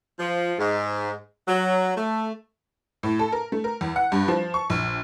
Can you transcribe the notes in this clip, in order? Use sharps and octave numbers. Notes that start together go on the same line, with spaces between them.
F3
G#2
F#3
A3
A2
A4
A#4
A3
A#4
E2
F#5
G2
F3
C#6
A#1